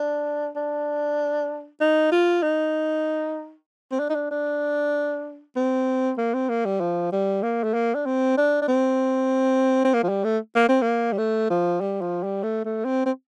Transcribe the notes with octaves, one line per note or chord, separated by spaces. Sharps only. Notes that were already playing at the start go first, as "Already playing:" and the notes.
Already playing: D4
D4
D#4
F4
D#4
C4
D4
D#4
D4
D4
C4
A#3
C4
A#3
G3
F3
G3
A#3
A3
A#3
D4
C4
D4
D4
C4
C4
A#3
F3
G3
A3
A#3
C4
A#3
G3
A3
F3
G3
F3
G3
A3
A3
C4
C4